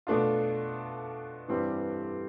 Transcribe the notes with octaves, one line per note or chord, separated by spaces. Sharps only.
B2 A3 D4 F4
G2 E3 G3 C4 G4